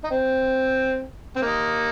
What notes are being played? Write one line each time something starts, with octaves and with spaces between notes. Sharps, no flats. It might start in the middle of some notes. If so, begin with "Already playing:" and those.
D#4
C4
C4
A#3 D#4